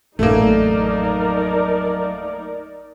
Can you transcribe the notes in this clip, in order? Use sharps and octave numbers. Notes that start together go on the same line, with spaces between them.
A1 F2 F#3 A3 A#3 D#4 A#4 D5